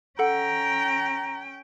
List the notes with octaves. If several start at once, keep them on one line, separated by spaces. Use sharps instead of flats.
C#4 A4 F#5 G5 A#5